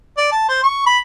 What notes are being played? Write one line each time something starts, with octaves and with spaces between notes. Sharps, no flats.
D5
A5
C5
C#6
B5